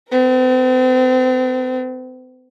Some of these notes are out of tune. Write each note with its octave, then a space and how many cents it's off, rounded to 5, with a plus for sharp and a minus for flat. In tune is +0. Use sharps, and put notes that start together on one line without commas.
C4 -40 A#4 +0